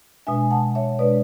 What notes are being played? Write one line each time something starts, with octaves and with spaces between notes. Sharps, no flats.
B2 G#3 D4 E5 G#5
F#5 A5
C#5 E5
B2 G#3 D4 B4 D5